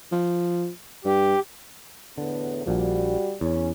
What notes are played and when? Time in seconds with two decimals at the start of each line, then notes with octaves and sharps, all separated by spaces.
0.12 F3
1.05 G2 G4
2.18 E2 A2 D3 B3
2.66 A#1 A#2 F3 G3 F#4
3.41 E2 C#4